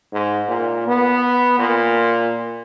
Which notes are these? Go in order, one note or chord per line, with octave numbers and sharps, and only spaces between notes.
G#2
A#2
B3
A#2